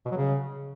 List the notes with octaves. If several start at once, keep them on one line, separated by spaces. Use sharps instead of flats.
B2
F#3
C#3